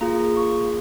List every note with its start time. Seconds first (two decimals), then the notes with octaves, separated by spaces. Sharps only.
0.01 A#3 F4 G#4 A#5
0.37 C#6